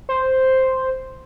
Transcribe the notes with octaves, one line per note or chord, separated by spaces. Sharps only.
C5